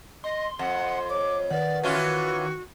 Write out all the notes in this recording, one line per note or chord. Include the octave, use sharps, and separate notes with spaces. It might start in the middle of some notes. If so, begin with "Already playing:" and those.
D#5 C6
F2 F#5
C#5 D6
D#3 B4 D5 F#5
E3 C#4 F4 F#4